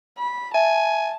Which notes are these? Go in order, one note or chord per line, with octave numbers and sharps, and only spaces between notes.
B5
E5 G#5 A5